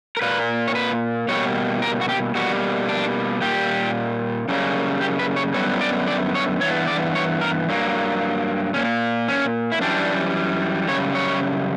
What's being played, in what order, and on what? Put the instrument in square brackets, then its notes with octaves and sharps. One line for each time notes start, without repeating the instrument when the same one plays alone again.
[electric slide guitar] A#4
A#2 A#3 B4
C#5
B4
B2 G3 A#3 C#5
A#4
F#4
G4
B2 G3 A#3 F#4
D4
A#2 G3 A#3 G4
F#2 C#3 G3 A#3
G4
B4
C#5
F#2 D3 G3 B3 C#5
D5
D5
C#5
G2 E3 B3 C#5
D5
C#5
A#4
G2 F#3 A#3
A#2 A#3 C#4
C#4
E4
F#2 E3 G3 D4
F#2 C#3 G3 C#5
C#5